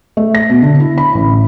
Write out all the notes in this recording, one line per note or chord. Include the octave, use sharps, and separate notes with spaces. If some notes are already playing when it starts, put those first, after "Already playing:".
A3
A#6
B2
D3
E4
B5
A1